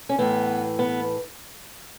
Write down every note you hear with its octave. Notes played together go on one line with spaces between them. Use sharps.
C#4
A2 E3 B3
B3